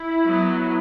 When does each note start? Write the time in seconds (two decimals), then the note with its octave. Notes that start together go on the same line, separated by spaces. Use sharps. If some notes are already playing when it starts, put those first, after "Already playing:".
Already playing: E4
0.25 F#3 B3